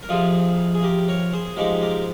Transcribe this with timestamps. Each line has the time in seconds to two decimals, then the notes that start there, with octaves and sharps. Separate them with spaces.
0.03 A#4
0.09 F2 C3 F3 F4 G#4
0.74 G#4
0.83 G4 A#4
1.08 A#4 C#5
1.32 G#4 C5
1.57 G#2 F3 G#3 G4 A#4
1.81 G4 A#4